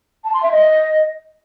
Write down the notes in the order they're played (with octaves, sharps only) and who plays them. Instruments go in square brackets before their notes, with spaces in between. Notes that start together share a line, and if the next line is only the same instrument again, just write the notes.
[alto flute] A5
C6
E5
D#5